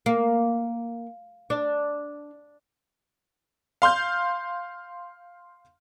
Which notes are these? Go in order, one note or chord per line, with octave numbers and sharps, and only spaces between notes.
A#3
D4
F5 C6 F6 G6